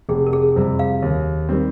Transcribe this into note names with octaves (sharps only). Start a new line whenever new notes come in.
F1 G#4
A#4
G#4
F2 C3 G3
F5
D#2
D#3 G3 C4